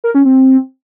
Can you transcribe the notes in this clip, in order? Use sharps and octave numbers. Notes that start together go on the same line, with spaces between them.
A#4
C#4
C4